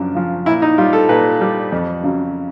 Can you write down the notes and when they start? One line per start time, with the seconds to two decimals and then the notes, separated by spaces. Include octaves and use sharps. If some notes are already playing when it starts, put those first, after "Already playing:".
Already playing: F#2 C#3 F3 D4
0.15 C#3 F3
0.46 A#2 E4
0.62 D#4
0.78 G3 F4
0.93 A4
1.09 A#2 B4
1.41 G3
1.72 F2
2.04 C#3 F#3